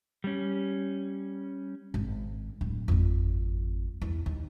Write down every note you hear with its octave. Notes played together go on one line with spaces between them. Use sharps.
G3 C#4
G#1
D1
G#1 F2
E2
D#2